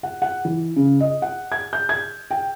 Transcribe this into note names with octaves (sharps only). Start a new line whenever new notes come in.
F#5
F#5
E3
C#3
D#5
F#5
G#6
G6
G#6
G5